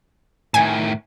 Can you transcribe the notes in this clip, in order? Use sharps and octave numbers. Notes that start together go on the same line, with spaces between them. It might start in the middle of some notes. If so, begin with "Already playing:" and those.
A2 D#3 G#5